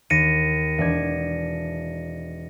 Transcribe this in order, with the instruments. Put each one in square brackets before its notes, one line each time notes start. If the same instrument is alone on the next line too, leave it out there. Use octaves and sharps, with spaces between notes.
[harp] D#2 [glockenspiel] A#6 C#7 D#7
[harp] E1 D5 G#6